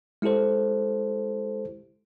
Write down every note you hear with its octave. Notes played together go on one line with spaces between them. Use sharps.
G#3 E4 G4 A4 C5